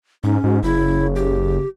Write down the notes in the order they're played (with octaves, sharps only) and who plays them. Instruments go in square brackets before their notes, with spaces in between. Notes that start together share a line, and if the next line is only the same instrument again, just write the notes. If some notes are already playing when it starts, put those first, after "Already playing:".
[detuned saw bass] G#2 [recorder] C#4 [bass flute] D#4
[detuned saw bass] G#2 [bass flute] F#4
[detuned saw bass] F#1 [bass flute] C#3 [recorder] E4
[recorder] G4